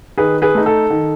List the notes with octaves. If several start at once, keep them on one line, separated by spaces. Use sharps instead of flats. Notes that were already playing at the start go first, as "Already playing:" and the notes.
D#3 G#4 B4
G#4 B4
A3 D#4
A4
D#3